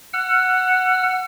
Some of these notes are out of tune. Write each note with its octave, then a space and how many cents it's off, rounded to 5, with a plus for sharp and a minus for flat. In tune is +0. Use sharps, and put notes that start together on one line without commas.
F#5 +0 E6 +45